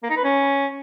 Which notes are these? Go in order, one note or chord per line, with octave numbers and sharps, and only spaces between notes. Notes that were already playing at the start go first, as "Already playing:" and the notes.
A#3
D#4
B4
C#4